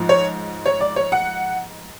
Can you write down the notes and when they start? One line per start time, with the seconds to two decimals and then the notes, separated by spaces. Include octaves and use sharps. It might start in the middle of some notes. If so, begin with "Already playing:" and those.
Already playing: G#2 F3
0.09 C#5
0.66 C#5
0.81 D5
0.96 C#5
1.12 F#5